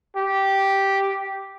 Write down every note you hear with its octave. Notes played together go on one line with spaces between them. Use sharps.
G4